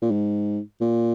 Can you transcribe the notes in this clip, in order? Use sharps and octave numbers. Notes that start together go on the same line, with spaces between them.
A#2
G#2
A#2